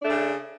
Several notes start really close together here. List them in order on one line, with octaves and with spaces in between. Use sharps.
D4 A3 C#3